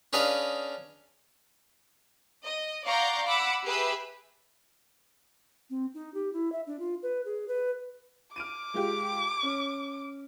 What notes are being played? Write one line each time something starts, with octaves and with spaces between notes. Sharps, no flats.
C#4 D4 G#4 B4 D#5 F5
D#5
D5 F5 F#5 A#5 C#6 G6
F#5 B5 D6 E6
G4 G#4 B4 E5
C4
D#4
G4
E4
E5
D4
F4
B4
G#4
B4
D6 F6 D7 D#7
G#3 F4 G4
C#4